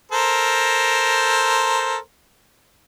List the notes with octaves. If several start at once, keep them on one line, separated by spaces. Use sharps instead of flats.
A4 A#4 C5